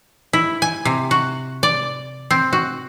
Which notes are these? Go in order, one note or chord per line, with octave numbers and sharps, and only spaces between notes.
E4
G#5
C3
F#4
D5
C4
F#4